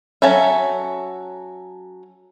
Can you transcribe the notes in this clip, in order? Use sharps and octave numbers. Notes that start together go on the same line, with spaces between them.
F#3 C#4 A4 E5